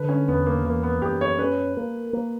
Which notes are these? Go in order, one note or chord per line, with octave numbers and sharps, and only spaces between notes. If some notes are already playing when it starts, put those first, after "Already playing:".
Already playing: D3 B4
C#4
E2 B3
A#3
E3 A#3
B3
F#2 G4
C#5
C#4 B4
A#3
A#3